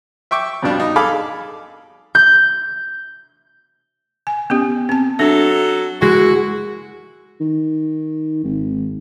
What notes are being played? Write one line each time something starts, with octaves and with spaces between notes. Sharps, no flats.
E5 G5 C#6 D6
F2 B2 G3 D4 F5
D#4
G#4 A4 F5 G#5 B5 D6
G6
G#5
B3 C#4 G4
C4 A5
F#3 D4 A4 E5
G#3 E4 F#4
D#3
G#1